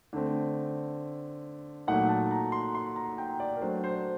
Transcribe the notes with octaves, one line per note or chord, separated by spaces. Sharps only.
D3 A3 C4
A#2 F#3 A3 D#4 F#5
A5
A#5
C6
C6
A#5
G5
D5
A#4
F#3 A3 D4 C5
C5